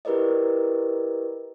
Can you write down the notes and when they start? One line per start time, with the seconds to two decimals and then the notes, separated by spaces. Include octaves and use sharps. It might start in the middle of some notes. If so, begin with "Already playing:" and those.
0.05 E4 G4 A#4 B4 D5 D#5